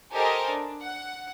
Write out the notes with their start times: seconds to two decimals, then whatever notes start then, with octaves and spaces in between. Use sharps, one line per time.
0.12 G4 A4 A#4 C5 D#5 G#5
0.50 D4
0.83 F#5